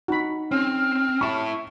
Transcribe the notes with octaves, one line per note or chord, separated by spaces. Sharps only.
D#4 F#4 B5
C4 C#4 F6
E4 A5 C#6